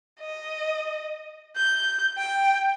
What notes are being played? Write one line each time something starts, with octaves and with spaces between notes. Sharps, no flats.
D#5
G6
G5